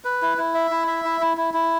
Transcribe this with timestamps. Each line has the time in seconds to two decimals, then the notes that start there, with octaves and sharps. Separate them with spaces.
0.04 B4
0.22 E4
0.38 E4
0.55 E5
0.71 E4
0.87 E5
1.05 E4
1.21 E4
1.37 E4
1.54 E4